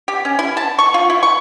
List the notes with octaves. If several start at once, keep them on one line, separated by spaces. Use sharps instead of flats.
G4
C#4
E4
A5
C#6
F4
E4
C#6